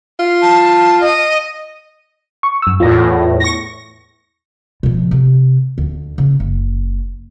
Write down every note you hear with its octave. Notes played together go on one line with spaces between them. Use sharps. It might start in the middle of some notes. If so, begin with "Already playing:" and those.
F4
A5
D#5
C#6
F#2 E6
E2 A2 F4 A#6
C#6 A#6
B2 F3
C3
D2 D3
C#3
F#1